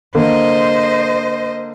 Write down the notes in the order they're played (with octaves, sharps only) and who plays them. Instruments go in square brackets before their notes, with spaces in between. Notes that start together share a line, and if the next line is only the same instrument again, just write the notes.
[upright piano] D3 A#3 [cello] C5 D#5